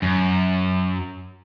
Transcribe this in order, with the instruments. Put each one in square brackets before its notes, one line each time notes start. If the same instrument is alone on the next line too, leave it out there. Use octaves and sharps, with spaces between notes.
[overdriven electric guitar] F#2